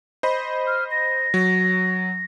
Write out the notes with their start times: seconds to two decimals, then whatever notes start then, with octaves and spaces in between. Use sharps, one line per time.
0.23 C5 D#5 B5
0.67 F6
0.91 A#6
1.34 F#3